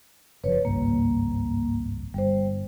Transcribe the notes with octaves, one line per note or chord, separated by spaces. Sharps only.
F#1 A#2 F3 B4 C#5
G#1 C#2 G2 A#3
G1 G3 C5